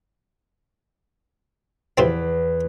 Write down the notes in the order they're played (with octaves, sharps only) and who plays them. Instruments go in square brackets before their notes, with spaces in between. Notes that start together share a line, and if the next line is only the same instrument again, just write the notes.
[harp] E2 B4 D7 [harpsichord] C3 F3 C4